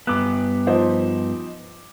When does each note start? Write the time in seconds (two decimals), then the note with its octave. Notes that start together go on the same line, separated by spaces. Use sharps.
0.07 G2 B3 D6 F#6
0.67 F3 D#4 C5